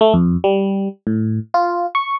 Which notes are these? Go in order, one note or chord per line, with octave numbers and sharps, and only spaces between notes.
A3
F2
G3
A2
F4
C#6